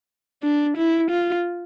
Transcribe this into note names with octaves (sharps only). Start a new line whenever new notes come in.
D4
E4
F4